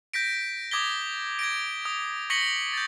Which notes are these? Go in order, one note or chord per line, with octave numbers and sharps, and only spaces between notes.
G6 A#6 B6 D7
D6 D#6 G#6 A#6 B6 G7
G#6 A#6 D7
D#6
C#6 A#6 B6 C#7 F#7 G7
G6 A6